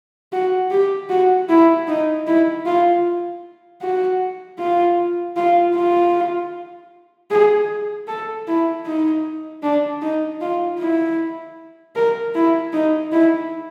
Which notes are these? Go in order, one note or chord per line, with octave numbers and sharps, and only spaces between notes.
F#4
G4
F#4
E4
D#4
E4
F4
F#4
F4
F4
F4
G#4
A4
E4
D#4
D4
D#4
F4
E4
A#4
E4
D#4
E4